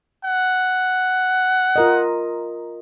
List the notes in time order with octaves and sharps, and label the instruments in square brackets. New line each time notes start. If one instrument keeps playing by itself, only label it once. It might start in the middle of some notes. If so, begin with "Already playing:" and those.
[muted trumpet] F#5
[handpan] F4 A#4 D#5